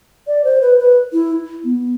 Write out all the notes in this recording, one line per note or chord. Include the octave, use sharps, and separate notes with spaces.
D5
C5
B4
B4
E4
B3